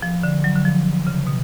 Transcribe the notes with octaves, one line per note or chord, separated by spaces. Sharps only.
F3
D3
F#3
D3
F3
C#3
B2